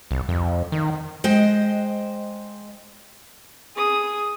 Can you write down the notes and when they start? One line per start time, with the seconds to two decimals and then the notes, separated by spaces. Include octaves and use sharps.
0.11 C2
0.29 F2
0.72 D#3
1.24 G#3 C5 D#5 G5
3.76 G#4 D#6